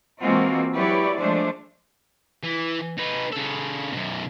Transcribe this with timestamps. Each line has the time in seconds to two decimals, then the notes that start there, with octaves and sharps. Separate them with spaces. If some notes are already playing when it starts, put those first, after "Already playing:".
0.22 E3 G#3 A#3 C4 F4 F#4
0.75 F#3 E4 G4 B4 C#5 D5
1.18 F3 G#3 A3 D4 C5
2.43 E3
2.98 D#4 B4
3.32 C#3 A4
3.93 F#2 B2